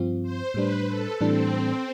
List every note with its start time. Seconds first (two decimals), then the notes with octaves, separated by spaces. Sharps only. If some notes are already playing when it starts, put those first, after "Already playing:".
Already playing: G2 F3 C4 F4
0.23 C5
0.54 A2 G3 D4 B4
0.88 A4
1.20 A2 E3 G3 C4 D4 A4